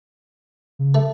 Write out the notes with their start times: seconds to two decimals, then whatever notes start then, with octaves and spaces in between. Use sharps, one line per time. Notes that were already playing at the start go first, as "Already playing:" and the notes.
0.79 C#3
0.95 A3